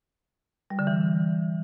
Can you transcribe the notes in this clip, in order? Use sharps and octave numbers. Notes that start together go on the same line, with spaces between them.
G3
D3
E3